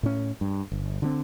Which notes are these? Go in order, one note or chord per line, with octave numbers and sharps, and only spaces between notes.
A2 C#4
G2
G1
D3 F3 C4